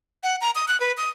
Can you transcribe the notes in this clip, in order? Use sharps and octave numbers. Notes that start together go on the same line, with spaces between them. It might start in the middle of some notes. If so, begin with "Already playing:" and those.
F#5
A#5
D#6
F#6
B4
D#6